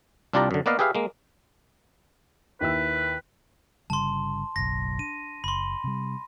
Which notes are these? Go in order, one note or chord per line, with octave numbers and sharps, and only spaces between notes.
C2 D4 F4 G4 D5 A#5
F#2 D3
A#3 B3 B4 D5 D#5 F5
G4 G#4 B4 E5 F5
G#3 A#3
D#2 E4 B4 E6
G1 C#3 G3 A5 C6
F#1 B1 A#6
D4 D#7
F#1 B5 C6
C3 G3